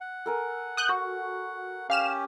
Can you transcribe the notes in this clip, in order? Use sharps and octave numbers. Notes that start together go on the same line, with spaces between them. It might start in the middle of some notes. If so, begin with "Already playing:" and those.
F#5
A4 A#4 G#5
D#6 F#6 G6
F#4 C#6
C#4 G4 F5 F6 E7